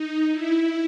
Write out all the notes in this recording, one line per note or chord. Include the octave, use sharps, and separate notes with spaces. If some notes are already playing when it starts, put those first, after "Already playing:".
Already playing: D#4
E4